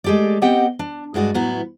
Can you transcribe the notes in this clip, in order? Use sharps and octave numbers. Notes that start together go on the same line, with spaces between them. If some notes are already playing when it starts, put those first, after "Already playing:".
G#3 A3 G4 A4 D5
B3 C4 G4 D#5 F#5 G5
D4
G2 G#3 F#4 D5 D#5
A2 F#3 B3 E4